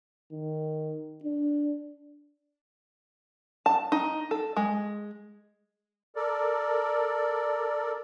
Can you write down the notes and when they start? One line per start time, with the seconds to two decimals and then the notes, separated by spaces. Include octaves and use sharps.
0.32 D#3
1.24 D4
3.66 A5
3.92 D#4
4.31 A4
4.57 G#3
6.16 A4 A#4 D5